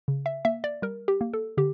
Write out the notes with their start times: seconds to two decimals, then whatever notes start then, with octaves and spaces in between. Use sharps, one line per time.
0.08 C#3
0.26 E5
0.45 A#3 E5
0.64 D5
0.82 G3 A#4
1.08 G4
1.21 A#3
1.34 A4
1.57 D3 G4